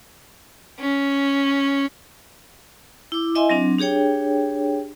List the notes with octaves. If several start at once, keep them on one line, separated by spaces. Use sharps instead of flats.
C#4
E4 D6
E4 D#5 E5 G#5 C6
F#3 C4 D4
D4 G4 G#4 C#5 G5